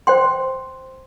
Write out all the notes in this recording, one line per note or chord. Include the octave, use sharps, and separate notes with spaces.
C5 G5 C6